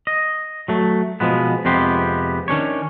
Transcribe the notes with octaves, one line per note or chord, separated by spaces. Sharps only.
D#5
F#3 A3
B2 F3 G#3 B3
F2 C3 G#3 B3 G4 C6
D#3 C#4 D4 C#5